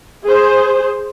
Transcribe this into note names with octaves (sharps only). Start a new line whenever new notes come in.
G#4 C5